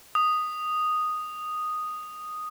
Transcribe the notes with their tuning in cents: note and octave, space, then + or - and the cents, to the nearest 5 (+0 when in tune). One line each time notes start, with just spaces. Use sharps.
D#6 -5